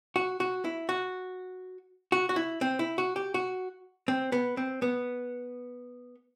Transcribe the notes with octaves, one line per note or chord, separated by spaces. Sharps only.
F#4
F#4
E4
F#4
F#4
F#4
E4
C4
E4
F#4
G4
F#4
C4
B3
C4
B3